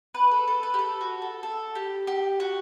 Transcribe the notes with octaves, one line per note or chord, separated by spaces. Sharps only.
B4
A4
A4
B4
G4
A4
F#4
A4
A4
G4
G4
F#4